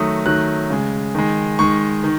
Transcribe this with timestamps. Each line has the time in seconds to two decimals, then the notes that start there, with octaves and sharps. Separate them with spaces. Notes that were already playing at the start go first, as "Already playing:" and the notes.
Already playing: D#3 F#3 A3 D#6
0.26 D#3 F#3 A3 F#6
0.70 C#3 G#3
1.15 D#3 G#3
1.59 D#3 G#3 C#6
2.04 D#3